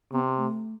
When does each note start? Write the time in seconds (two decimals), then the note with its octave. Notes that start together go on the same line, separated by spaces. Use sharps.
0.12 C3 B3
0.37 A3